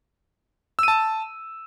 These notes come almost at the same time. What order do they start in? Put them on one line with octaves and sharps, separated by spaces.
E6 D#7 A5